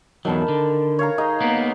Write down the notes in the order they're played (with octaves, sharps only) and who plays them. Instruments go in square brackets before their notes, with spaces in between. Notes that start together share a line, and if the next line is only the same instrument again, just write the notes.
[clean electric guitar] E2 F#3 [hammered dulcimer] D#3 A5 B5
[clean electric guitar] D3
[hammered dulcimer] C#5 F5 A#5
D#4 G#4 D#5
[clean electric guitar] A#3 B3